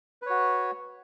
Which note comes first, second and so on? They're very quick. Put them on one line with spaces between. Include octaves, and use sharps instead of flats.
B4 C#5 F#4